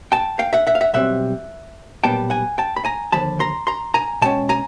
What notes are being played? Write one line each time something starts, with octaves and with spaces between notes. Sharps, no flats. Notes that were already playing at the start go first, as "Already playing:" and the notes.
G5 A5
F5 G5
E5 F#5
E5 F#5
F5
E5 F#5
B1 B2 G3 C4 E5 F#5
B1 A#2 G3 B3 G5 A5
F#5 G#5
G5 A5
B5
G#5 A#5
D#2 D3 F3 A5 B5
A#5 C6
A#5 C6
G#5 A#5
B2 G#3 C#4 G5 A5
G#5 A#5